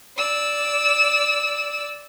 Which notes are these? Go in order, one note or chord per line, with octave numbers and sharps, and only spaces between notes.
D5 E6